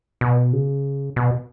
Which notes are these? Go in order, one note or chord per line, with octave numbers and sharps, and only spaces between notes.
B2
C#3
B2